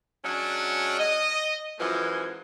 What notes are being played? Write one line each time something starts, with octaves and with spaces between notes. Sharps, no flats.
F#3 G#3 C#4 D4
D#5
F#2 E3 F3 G#3